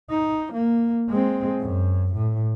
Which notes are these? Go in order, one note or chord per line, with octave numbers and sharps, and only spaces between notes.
D#4
A#3
G#3 C4
F#2
A2